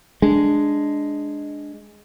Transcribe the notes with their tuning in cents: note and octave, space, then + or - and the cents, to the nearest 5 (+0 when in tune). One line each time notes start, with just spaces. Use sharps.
G#3 +0 D4 +0